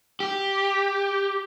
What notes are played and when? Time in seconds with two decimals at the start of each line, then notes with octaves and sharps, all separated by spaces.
0.20 G4